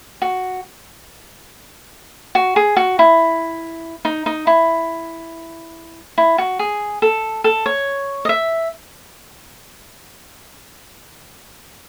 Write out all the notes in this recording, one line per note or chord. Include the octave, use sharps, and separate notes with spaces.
F#4
F#4
G#4
F#4
E4
D#4
D#4
E4
E4
F#4
G#4
A4
A4
C#5
D#5
E5